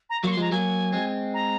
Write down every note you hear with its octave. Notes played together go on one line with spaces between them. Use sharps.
A#5
F#3 A#3 C#6
C6
F3 G#3 A#5
F#3 A#3 G#5
G#3 C4
A#5